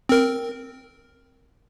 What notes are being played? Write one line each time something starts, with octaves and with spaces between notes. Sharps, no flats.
C4 A#4